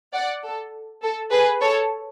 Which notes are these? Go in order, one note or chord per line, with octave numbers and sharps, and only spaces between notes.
D5 F#5
A4
A4
G#4 B4
A4 C#5